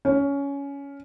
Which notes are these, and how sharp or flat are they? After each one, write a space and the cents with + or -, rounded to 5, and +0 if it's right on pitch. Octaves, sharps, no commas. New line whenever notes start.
C#4 +15